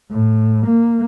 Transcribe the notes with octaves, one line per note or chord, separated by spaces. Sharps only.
A2
A#3